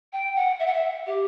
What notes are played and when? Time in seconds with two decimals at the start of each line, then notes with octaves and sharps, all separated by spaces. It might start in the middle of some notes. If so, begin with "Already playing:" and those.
0.13 G5
0.36 F#5
0.59 E5
0.66 F#5
0.74 E5
1.06 G4